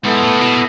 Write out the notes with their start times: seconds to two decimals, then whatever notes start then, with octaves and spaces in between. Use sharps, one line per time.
0.04 G#2 B3 E4 A4
0.23 A2
0.41 B2